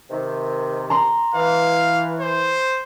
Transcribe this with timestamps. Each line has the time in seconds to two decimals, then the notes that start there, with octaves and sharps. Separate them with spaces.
0.11 C3 D#3
0.90 A#5 C6
1.34 E3 F5
2.20 C5